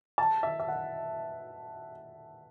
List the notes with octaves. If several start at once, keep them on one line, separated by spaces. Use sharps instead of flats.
A5
E5
E5
F#5